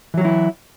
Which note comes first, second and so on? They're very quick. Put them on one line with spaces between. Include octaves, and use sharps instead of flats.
E3 F#3 F#4 E4